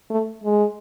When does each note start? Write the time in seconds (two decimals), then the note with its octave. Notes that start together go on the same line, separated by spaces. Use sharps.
0.10 A3
0.44 G#3